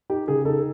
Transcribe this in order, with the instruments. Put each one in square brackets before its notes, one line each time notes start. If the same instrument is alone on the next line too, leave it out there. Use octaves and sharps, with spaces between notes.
[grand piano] D#4 G4
C#3 G#4
D#4 A4